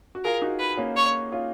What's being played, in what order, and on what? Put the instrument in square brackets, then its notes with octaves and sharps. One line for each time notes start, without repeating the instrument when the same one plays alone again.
[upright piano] F#4
[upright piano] F4 G#4 [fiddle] A#4
[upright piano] D#4 F#4
[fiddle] B4
[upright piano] A#3 C#4
[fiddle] C#5
[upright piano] C#4 F4